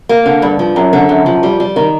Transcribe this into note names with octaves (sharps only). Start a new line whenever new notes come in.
A#3
D3
G2
F3
F#2
D3
F#2
F3
G3
G3
D#3